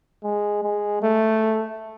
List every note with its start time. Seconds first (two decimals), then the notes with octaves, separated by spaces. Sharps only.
0.24 G#3
0.63 G#3
1.02 A3